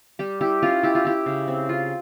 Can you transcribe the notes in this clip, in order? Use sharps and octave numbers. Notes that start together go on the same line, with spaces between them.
G3 G4
E4 G4
C#4 F4
E4 G4
F4
E4 G4
C#3
C4
F4